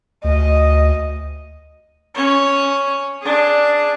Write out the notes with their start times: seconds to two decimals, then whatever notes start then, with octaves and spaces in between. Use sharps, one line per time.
0.24 D2 D#5
2.15 C#4 C#5
3.21 D4 G#4